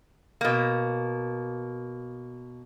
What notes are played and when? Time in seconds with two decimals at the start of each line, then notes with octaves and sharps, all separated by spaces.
0.41 B2 A#3